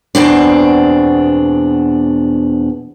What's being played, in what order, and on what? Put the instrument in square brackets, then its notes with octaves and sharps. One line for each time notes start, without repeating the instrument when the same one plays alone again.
[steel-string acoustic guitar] E2 B2 C4 D4